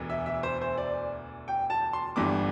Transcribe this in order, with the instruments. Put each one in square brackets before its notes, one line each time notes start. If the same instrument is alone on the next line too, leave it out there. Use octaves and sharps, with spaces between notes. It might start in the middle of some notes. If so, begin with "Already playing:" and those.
Already playing: [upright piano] E1 D2 E3
E5
E5
C5
C5
D5
G5
A5
C6
G1 G2 E3 D6